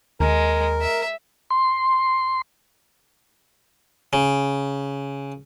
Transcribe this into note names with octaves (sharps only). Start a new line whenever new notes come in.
D#2 G#3 A#4
E5
C6
C#3